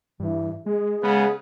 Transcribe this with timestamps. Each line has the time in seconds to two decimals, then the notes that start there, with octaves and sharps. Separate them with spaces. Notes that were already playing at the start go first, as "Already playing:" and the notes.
0.20 G2 E3
0.66 G#3 G#4
1.03 C#3 G#3 B3